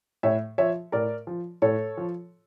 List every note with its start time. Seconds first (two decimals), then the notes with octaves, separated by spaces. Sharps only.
0.23 A2 C#5 E5
0.58 F3 C#5 E5
0.92 A2 A#4 D5
1.27 F3
1.62 A2 A4 C#5
1.97 F3